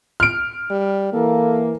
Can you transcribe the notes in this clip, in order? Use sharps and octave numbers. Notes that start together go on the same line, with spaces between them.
F6 D7
G3
E3 A#3 A4